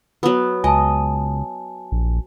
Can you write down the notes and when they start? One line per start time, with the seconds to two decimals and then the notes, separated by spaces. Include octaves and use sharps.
0.23 F#3 B3
0.64 C#2 D#5 G#5 A5
1.92 A#1